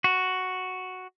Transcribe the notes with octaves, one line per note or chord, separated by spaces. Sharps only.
F#4